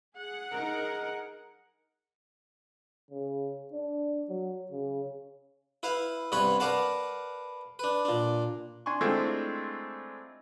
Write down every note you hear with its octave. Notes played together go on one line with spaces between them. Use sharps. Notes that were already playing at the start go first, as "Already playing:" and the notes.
G#4 F#5
D#4 A#4
C#3
D4
F#3
C#3
E4 B4 E5 F5
G2 C3 B3 C#5 F#5 B5
A#4 B4 D5 F5 F#5 A5
D4 B4
A#2 D4
D4 G#5 C6 C#6
G#3 A3 C4 D4 E4 F4